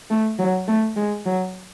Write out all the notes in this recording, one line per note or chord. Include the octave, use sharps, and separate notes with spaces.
A3
F#3
A3
G#3
F#3